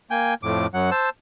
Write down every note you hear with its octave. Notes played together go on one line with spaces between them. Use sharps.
A#3 G5 G#5 G6
F2 A2 D6
F#2 F#3 F#5
C5 A5 E6